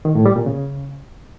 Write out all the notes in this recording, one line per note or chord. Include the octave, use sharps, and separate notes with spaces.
D#3
A2
G3
A#2
C#3